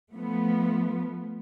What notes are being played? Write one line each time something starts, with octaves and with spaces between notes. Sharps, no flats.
F3 A3 B3